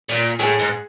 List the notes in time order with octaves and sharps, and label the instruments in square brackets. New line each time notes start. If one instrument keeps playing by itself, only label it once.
[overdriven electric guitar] A#2
[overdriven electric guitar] A2 [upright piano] G#4
[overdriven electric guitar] G#2